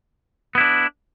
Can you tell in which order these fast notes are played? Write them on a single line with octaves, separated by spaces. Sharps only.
B3 E4 D4